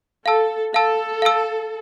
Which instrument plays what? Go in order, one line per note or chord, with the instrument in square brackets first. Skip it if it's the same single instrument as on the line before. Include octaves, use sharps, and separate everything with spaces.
[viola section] A4 [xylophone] F5 A5 E6
[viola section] A4 [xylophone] F5 A5 E6
[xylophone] F5 A5 E6